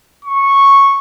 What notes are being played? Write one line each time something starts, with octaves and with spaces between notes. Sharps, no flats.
C#6